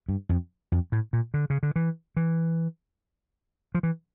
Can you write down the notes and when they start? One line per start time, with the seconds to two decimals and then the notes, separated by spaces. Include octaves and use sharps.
0.09 G2
0.29 F2
0.72 F2
0.92 A2
1.13 A#2
1.34 D3
1.50 C#3
1.63 D3
1.76 E3
2.17 E3
3.75 F3
3.83 E3